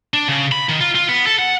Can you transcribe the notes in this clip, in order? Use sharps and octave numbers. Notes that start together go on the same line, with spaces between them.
D4
C#3
B5
D#3
F4
F4
B3
A4
F#5